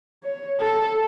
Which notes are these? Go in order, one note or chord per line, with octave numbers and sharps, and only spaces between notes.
C#5
A4